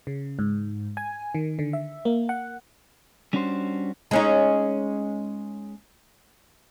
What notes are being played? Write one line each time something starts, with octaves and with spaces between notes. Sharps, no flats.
C#3
G#2
G#5
D#3
D3
E5
A#3
F#5
G3 C#4 D4 F#4 B4 C5
G#3 C#4 D#4